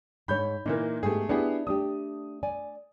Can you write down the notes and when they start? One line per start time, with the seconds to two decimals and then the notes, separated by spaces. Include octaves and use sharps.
0.28 G#2 C#5 B5 G6
0.66 A#2 E3 A#3 D#4
1.03 G#2 A3 B3 G4 G#4
1.29 B3 D4 E4 G4 G#4
1.67 A3 D4 G4 D#6
2.43 D5 G#5